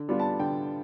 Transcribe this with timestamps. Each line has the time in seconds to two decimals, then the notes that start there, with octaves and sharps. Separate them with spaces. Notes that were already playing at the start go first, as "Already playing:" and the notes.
Already playing: D3
0.09 G3 B3 D4 F4
0.19 A5
0.40 D3 G5